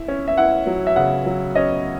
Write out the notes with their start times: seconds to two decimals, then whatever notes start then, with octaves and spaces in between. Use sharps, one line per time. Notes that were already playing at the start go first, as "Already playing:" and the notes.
Already playing: E4 E5
0.08 C#4
0.28 E5
0.38 E4 F#5
0.67 F#3
0.87 E5
0.96 C#3 F#5
1.26 F#3
1.55 C#4 D#5